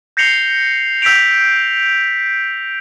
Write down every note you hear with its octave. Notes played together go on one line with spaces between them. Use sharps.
G6 A#6 C7 C#7 F7 G7
E6 G6 B6 C#7 D7 F7